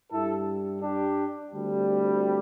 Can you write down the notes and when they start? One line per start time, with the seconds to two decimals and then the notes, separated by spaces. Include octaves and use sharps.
0.11 G2 G3 E4 A4
0.82 D4 G4
1.53 D2 C3 G3